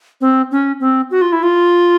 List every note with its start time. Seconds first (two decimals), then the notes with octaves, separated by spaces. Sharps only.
0.21 C4
0.51 C#4
0.80 C4
1.11 F#4
1.22 F4
1.33 E4
1.43 F4